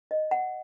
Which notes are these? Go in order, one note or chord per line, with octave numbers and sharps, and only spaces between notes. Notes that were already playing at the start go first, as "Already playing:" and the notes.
D#5
F#5